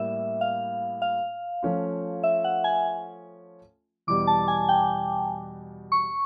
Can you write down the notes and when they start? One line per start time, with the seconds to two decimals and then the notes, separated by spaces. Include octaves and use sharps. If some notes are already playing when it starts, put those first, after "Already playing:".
Already playing: A2 G3 A#3 E5
0.41 F5
1.02 F5
1.63 F3 A3 C#4 F4
2.23 E5
2.44 F#5
2.64 G#5
4.07 E2 B2 G3 D6
4.27 A5
4.48 G#5
4.69 G5
5.92 C#6